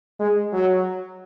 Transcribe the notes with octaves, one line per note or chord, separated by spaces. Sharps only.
G#3
F#3